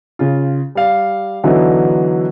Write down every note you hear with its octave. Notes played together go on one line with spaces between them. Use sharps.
C#3 F4
G3 F5
D3 E3 F#3 B3 D#4 E4